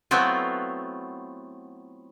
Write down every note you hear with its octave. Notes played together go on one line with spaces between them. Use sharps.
F#3 A3 B3 C4 E4 F4